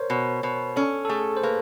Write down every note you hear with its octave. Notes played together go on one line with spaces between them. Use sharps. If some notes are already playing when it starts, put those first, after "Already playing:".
Already playing: A#4 C5 C#5
B2
B2
C#4 A4
A4
A3 G#4
C5
A#3 B4